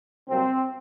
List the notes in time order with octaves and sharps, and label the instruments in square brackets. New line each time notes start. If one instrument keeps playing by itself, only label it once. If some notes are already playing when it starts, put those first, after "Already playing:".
[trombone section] C2 A#2 F#3 C4